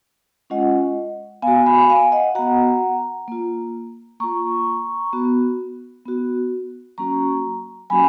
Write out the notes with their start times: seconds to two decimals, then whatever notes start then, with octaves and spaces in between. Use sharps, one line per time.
0.50 G#3 C#4 F4 D#5 F#5
1.42 B3 F5 G#5
1.47 F#4
1.66 G#5 B5
1.90 F5 G#5
2.12 D#5 F#5
2.35 B3 F#4 F#5 A#5
3.28 A#3 F4
4.20 A#3 F4 A#5 C#6
5.13 B3 F#4
6.06 B3 F#4
6.98 F#3 A#3 C#4 F#4 A#5 C#6
7.90 F#3 A#3 C#4 F#4 G#5 B5